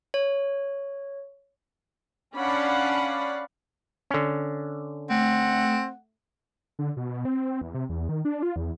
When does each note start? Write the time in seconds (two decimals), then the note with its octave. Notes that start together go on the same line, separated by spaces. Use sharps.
0.14 C#5
2.35 C#4 D4 D5 F5 F#5 B5
4.11 D3 C#4
5.10 A3 C4 F#5
6.79 D3
6.97 B2
7.09 B2
7.25 C4
7.61 E2
7.75 C3
7.89 E2
8.09 D#3
8.25 D4
8.43 F4
8.56 E2